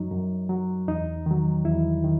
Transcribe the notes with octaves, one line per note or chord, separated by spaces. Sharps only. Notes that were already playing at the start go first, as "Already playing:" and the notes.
Already playing: F#2 F#3 D#4
F#2
F#3
E2 D#4
D#3 F#3
E2 E4
D#3